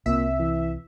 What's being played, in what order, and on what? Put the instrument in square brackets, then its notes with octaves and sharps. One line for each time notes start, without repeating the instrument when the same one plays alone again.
[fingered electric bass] C2 C4 [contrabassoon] A#2 [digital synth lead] E5
[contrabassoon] E3